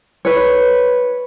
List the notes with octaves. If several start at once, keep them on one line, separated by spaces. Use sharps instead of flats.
B4 C#5